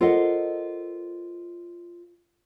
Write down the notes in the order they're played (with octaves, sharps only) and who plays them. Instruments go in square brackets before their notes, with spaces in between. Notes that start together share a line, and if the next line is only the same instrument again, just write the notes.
[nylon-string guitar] F4 A4 A#4 C5 D#5 F#5